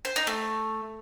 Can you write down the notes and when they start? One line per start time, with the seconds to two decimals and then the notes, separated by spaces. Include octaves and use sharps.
0.05 C5
0.16 D#4
0.27 A3